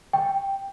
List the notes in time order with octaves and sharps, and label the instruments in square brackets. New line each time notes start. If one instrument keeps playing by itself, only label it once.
[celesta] G5